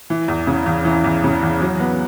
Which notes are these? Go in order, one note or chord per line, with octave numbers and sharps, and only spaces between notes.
E3
E2
C#3
E2
E3
E2
C#3
E2
F#3
B3